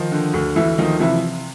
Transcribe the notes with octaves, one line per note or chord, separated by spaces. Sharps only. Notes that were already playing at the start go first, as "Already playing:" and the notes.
Already playing: D#3 F3 D#4
D3
D2
D2 E3 E4
D#3 F3 D#4
C3 E3 E4